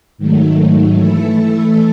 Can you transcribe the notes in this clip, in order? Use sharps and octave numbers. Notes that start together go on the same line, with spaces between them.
G#2 D#3 F#3 A3
E3 A3 E4 A4